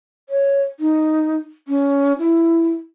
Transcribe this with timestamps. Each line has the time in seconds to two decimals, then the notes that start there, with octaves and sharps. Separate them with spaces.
0.29 C#5
0.80 D#4
1.68 C#4
2.18 E4